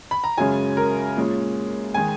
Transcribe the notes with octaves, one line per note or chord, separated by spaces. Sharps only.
B5
A#5
F#2 C#3 G#3 C#4 G#5
A#4
A#2 G#3 C#4
D#3 G#3 G#5